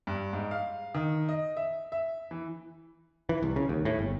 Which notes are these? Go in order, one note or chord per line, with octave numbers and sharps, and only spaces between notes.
G2
G#2
F5
D#3
D#5
E5
E5
E3
E3
C2
C#3
D#2
A2
G1